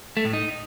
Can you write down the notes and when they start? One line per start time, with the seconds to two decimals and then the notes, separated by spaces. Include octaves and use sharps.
0.17 A3
0.25 A2
0.33 D#4